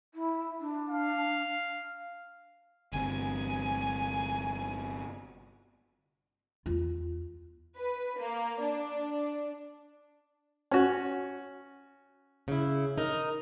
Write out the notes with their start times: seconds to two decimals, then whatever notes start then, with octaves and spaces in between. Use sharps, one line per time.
0.15 E4
0.61 D4
0.89 F5
2.93 G1 C3 G#5
6.66 E2 F4
7.77 B4
8.18 A#3
8.60 D4
10.71 C#4 F#4
12.48 C#3 E4
12.98 D#4 A#4